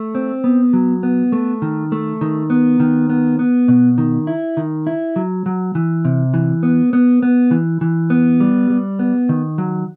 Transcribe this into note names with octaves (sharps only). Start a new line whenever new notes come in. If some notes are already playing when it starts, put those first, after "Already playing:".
Already playing: A3
C4
B3
F#3
B3
A3
D#3
A3
D#3
B3
D#3
B3
B3
B2
D#3
E4
D#3
E4
F#3
F#3
E3
C3
E3
B3
B3
B3
E3
E3
B3
G3
G3
B3
D#3
F#3